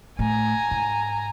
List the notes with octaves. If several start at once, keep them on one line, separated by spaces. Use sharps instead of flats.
A2 A3 G#5 A#5
G#2